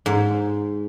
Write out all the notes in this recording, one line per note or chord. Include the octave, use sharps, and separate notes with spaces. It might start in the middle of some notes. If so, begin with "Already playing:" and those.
G#2